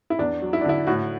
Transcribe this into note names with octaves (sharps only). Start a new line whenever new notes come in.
E4
E2 D4
F#3
E4
D4
D3 E4
A2 F#4